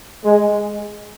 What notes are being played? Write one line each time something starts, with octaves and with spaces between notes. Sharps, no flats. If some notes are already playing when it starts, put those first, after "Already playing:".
G#3